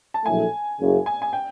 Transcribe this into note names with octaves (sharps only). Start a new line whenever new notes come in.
A5
A#1 A2 F#3 A3 G#5
F#1 F#2 C#3
G#5
G#5
G5